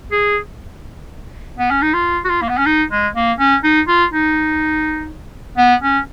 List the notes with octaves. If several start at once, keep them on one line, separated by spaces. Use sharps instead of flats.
G#4
B3
C#4
D#4
F4
F#4
F4
A#3
B3
C#4
D#4
G#3
A#3
C#4
D#4
F4
D#4
B3
C#4